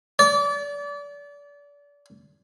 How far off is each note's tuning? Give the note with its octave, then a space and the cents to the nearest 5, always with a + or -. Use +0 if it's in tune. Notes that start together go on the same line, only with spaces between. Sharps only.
D5 -30